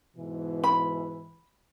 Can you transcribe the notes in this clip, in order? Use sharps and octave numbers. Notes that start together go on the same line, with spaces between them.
G#2 B2 E3
B5